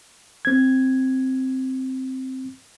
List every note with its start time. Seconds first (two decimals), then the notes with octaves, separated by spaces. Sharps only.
0.45 C4 G#6